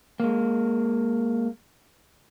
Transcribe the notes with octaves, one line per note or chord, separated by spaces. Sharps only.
G#3 A#3